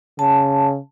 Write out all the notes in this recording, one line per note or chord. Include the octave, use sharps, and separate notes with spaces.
C#3 A5